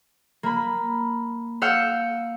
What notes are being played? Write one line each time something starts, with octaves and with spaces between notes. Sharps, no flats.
A#3 B5
F5 F#5 E6 G6